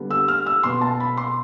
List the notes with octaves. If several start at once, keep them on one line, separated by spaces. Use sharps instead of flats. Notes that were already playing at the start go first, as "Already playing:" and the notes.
Already playing: D3 G3 B3
E6
F6
E6
B2 B3 C6
A5
B5
C6